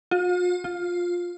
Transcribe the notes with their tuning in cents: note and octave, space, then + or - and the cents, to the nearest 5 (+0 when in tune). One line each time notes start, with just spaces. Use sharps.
F4 +45
F4 +10